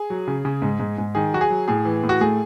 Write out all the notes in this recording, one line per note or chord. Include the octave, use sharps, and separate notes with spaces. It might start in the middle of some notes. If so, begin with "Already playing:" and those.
Already playing: G#4
F#3
C#3
C#3
G#2
G#2
G#2
D#3 G#4
F#3 F#4
G#4
F#3
A2 G#4
E3
A2
F#4
A3 G#4